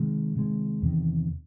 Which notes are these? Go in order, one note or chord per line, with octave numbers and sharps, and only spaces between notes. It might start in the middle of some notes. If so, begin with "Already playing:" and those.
Already playing: C3 D#3 G#3
C3 D#3 G#3
E2 C3 D#3